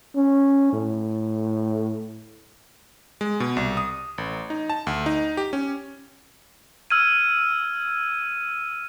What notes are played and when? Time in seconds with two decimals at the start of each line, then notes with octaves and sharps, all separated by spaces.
0.15 C#4
0.73 A2
3.21 G#3
3.40 B2
3.57 C2
3.77 D#6
4.18 A1
4.50 D#4
4.70 A5
4.87 D2
5.06 D#4
5.37 G4
5.53 C#4
6.90 E6 F6 G#6 D#7